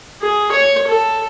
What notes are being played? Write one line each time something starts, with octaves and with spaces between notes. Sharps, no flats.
G#4
C#5
A4